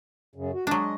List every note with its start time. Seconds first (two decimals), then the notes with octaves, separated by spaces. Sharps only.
0.36 F#2 C#3
0.54 F#4
0.67 F#3 G#3 D4 D#5